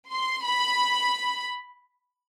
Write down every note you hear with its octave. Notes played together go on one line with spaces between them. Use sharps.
C6
B5